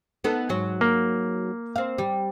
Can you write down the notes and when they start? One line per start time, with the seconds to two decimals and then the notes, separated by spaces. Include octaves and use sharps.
0.24 B3 D#4 A4
0.49 G#2 F#3
0.81 A#3
1.76 C4 F5
1.98 G3